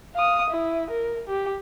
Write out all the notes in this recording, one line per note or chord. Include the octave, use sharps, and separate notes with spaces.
F5 D#6
E4
A#4
G4